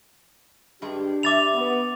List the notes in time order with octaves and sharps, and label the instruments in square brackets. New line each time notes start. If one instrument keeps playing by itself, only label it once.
[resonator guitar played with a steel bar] G2 G#3 [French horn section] D4 G4
[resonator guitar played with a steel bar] E3 E5 [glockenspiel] D6 A6 F7
[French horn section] B3